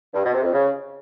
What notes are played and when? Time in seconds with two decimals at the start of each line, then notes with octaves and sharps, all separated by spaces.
0.14 G2
0.23 B2
0.33 C3
0.43 F2
0.52 C#3